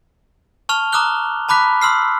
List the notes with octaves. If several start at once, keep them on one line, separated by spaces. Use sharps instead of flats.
A5 C#6 F6 F7
A#5 D6 D#6 F6 F#6 G7
A5 B5 D6 F#6 B6
C6 E6 F6 C7